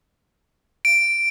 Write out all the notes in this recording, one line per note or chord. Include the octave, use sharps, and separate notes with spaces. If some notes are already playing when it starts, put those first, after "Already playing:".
D7